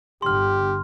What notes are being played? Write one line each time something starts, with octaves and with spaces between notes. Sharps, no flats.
G1 D3 G4 C6 F6